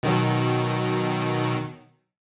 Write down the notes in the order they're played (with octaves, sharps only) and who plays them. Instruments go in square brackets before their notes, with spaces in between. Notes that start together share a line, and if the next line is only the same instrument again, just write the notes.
[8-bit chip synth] B2 D#3 F#3